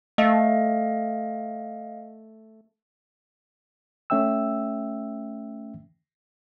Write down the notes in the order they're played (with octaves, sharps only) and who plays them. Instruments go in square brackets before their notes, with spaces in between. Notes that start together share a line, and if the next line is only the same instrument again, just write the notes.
[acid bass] A3 [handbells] D#5 F5
[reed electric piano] A3 C#4 E5 G5 E6